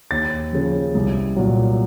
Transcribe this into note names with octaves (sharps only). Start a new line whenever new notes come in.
D#2 A6
C#3 F3
C2
A#2 F#3